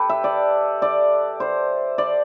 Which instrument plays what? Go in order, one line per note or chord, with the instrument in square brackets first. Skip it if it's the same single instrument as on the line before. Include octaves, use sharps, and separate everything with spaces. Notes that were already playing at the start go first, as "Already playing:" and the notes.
Already playing: [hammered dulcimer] G4 A4 B4
E5
D5
D5
C5
D5